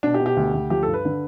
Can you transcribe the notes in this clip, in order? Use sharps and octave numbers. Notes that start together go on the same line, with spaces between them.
B2 D4
G4
B2
G4
D2
D2
F3 G4
G2 A4
B4
D3